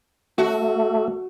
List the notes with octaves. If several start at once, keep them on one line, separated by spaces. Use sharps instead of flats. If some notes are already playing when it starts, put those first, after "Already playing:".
A3 F#4